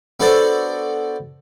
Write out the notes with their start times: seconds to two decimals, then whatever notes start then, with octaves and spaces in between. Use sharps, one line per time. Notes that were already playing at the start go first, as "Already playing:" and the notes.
0.20 B3 D4 F#4 A4 C5 D5